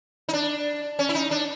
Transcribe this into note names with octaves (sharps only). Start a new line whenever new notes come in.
D#4
D4
C#4
E4
D#4
D4